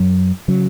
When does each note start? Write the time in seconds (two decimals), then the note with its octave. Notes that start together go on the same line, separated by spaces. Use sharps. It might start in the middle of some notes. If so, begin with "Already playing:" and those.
Already playing: F#2 F#3
0.48 C#3 F#3